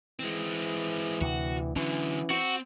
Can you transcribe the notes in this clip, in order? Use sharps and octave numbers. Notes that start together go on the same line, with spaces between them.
E3 G#3 C4
D2 C3 F#4
D3 E3 F#3 C#4
C4 F#4